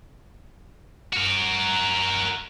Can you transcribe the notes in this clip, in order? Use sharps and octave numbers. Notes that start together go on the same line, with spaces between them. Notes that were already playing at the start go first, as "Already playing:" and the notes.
F#4 A#4